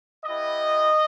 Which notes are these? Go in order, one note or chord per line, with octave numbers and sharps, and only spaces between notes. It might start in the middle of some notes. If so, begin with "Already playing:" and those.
B3 E4 G4 D#5